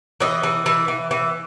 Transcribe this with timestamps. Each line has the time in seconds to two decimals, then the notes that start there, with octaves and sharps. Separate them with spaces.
0.20 E3 D#5
0.43 E3
0.66 E3
0.88 E3
1.11 E3